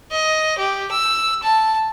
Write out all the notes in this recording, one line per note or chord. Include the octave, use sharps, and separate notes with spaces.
D#5
G4
E6
A5